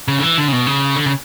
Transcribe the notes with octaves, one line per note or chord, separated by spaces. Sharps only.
C#3
D3
E3
D3
C#3
B2
C#3
D3
C#3